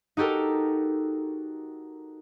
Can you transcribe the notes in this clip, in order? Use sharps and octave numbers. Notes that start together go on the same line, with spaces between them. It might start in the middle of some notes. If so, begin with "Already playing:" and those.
D#4 F#4 G4 A4 A#4